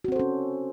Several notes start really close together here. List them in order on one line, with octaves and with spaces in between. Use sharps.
F#4 C4 C5 A4 C#4